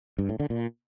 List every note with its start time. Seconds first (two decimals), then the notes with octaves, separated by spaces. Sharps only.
0.18 G2
0.29 A2
0.40 D3
0.50 A#2